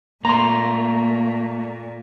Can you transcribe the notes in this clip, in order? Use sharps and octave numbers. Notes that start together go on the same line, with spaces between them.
A#2 A3 A#3 A#5 C6